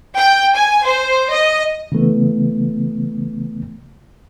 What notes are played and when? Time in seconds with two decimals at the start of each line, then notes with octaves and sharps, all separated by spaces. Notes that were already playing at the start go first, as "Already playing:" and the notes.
0.16 G5
0.55 G#5
0.85 C5
1.30 D#5
1.92 C#3 E3 A3 B3